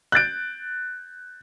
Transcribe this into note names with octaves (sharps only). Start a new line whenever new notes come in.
F#6 G6 A6 D7